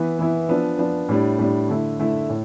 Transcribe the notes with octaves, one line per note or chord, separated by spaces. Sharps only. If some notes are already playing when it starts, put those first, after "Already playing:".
Already playing: E3 B3 E4
E3 B3 E4
F3 B3 D4
F3 B3 D4
A2 G3 D4
A2 G3 D4
D3 A3 E4
D3 A3 E4
A2